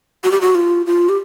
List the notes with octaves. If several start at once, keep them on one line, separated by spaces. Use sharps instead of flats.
F#4
G4
F#4
F4
F4
G4